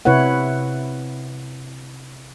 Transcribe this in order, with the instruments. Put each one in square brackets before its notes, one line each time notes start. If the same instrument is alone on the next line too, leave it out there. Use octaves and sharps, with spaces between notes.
[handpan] C3 E4 B4 C#5 F#5